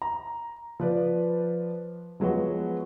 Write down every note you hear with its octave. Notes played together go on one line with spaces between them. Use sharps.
A#5
F3 B4 D5
F3 F#3 G#3 B3 F#4